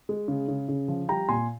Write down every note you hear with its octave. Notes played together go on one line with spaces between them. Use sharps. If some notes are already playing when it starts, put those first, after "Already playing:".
G#3
C#3
C#3
C#3
F3
G3 G5 A#5
A#2 G#5 C6